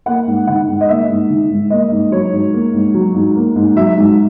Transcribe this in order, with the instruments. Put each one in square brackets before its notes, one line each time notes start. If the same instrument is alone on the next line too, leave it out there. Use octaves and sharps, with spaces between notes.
[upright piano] A#3 F#5
G#2
D#3 F#5
G#2
D#5
A#3 E5
G#2
D#3
G#2
A#3 D#5
G#2
F#3 C#5
G#2
A#3
G#2
F#3
G#2
A#3
G#2
F#3 E5
G#2